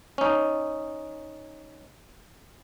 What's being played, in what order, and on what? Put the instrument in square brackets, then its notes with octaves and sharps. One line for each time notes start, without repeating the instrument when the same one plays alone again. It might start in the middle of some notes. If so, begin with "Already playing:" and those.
[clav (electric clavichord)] C#4 D#4